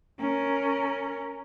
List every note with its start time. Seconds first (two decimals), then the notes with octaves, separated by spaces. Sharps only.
0.19 C#4 A#4